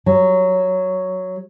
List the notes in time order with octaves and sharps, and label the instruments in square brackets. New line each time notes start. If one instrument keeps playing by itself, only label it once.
[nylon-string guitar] F#3